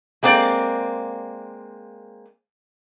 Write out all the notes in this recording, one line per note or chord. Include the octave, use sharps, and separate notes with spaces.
G#3 A#3 C4 D4 D5